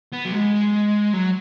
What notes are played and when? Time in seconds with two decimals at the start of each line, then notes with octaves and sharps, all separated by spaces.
0.12 B3
0.25 F#3
0.32 G#3
1.13 F#3